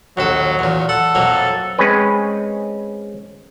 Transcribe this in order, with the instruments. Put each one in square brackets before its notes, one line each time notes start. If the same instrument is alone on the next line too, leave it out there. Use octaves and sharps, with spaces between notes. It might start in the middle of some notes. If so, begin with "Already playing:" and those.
[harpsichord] A#1 D#2 A4 [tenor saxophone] F#3
[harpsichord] E2 A#2
[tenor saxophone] A4 [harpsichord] F#5
[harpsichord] F2 F#3 A#3
[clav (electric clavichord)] G#3 C4 C#4 B4